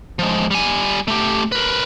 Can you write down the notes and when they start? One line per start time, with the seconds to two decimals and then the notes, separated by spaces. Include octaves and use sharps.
0.19 F3 G#3
0.51 G3 G#5
1.08 A3 G4
1.52 A#4 B4